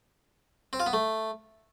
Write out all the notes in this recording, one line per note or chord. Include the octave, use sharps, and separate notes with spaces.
C4
F4
B3
A3